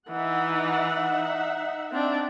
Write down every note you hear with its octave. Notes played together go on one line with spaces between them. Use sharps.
E3 D#4 E5 F#5
C4 D4